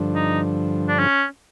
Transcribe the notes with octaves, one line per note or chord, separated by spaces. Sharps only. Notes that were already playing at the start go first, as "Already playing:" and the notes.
Already playing: G2 D3 F3
D#4
D4
C#4